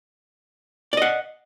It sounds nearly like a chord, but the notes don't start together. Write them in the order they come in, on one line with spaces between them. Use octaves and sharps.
D5 D#5 F#5